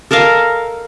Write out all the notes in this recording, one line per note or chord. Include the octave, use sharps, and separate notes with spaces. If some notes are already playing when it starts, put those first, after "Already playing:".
A4 A#4 D#5 F5